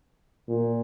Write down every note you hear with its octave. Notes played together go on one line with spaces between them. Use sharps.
A#2